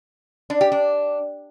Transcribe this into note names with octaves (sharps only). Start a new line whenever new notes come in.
D4
G4
D4